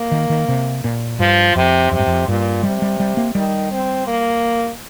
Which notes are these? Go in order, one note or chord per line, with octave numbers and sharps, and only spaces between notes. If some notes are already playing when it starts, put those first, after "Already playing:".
Already playing: A#3
D#3
D#3
C3
A#2
G2 F3
F2 C3
F2 C3
G2
F2
G2 A#2
C3 G3
G3
G3
A#3
D#3 G3
C4
A#3